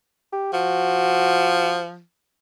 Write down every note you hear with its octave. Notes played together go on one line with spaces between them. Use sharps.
G4
F3 F#4